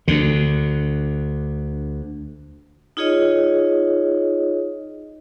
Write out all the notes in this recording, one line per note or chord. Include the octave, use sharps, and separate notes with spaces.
D2 D3
D#4 F4 G#4 C#5 D#5